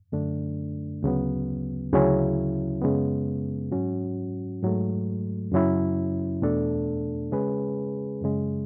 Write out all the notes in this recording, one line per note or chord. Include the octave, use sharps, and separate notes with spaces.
F#2 D3 A3 D4
D2 C#3 F#3 B3
D2 C#3 F#3 C#4 E4
F#2 C#3 G#3 B3
G#2 F#3 C#4 F#4
G#2 F#3 A3
F#2 C#3 F#3 C#4 E4
E2 B2 A3 D4 A4
C#3 G#3 C#4 G#4 B4
F#2 C#3 G#3